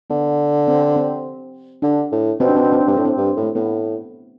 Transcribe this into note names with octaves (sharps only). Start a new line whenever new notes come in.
D3 B3
C4
C4
D3 D4
A2
B2 C4
D4
C4
D4
C4
D4
G2 C4
A2 D4
C4
G2
A2
A3
A2 B3